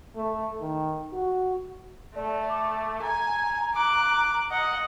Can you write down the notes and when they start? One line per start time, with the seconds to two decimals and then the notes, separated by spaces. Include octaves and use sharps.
0.15 A3
0.60 D#3
1.13 F#4
2.16 A3 D5
2.49 D6
3.02 G#5 A#5
3.74 D6 F#6
4.51 D#5 F#5